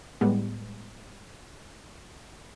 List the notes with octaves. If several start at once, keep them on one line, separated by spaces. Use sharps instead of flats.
A2 G3 G#3 B3